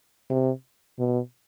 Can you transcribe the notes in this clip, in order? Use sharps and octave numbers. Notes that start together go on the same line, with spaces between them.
C3
B2